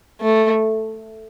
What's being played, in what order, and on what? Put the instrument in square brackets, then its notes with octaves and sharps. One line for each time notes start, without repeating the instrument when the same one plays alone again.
[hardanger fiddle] A3